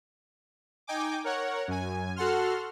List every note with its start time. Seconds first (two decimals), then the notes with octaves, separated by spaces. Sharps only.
0.87 D#4 G5 G#5 D6
1.24 A#4 C#5 F#5
1.68 F#2 G#5
2.16 F#4 A4 F#5 C6 F6